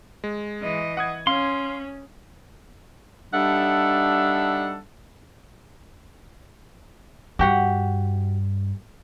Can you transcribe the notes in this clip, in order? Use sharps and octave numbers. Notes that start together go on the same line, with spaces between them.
G#3
E3 D#5
F#5 D#6 G#6
C#4 F5 C6
G3 D4 D#4 A4 E5 F#5
G2 F#4 G4 F#5